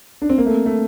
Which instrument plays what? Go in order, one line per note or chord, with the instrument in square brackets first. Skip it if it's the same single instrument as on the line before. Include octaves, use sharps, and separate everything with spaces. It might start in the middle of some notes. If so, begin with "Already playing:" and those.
[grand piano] D4
C4
A#3
A3
A3